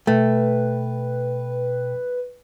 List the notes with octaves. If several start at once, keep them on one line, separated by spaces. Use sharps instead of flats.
B2 A3 B4 G5